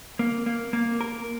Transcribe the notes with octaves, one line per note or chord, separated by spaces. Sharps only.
A#3
A#3
A#3
A#4